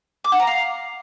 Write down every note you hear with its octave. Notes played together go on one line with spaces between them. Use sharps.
D6
F#5
A#5
F5